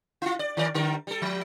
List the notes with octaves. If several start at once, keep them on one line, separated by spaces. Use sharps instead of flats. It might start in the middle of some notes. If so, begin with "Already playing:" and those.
E4 F4
D5
D#3 A#4 D5
D3 G3 A#4
G3 A4
F3